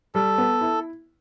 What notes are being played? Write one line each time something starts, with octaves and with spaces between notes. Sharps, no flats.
G3 A4
B3
E4